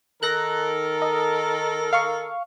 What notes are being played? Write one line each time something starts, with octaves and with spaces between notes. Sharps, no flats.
D#3 A4 A#4 F#6 A#6
D#5
F5 C#6